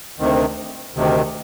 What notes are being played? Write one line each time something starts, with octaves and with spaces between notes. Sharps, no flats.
D2 C3 D#3
D2 C3 D#3